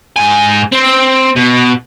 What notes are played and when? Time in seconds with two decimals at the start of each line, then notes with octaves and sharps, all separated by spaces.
0.16 G#2 G#5
0.72 C4
1.36 B2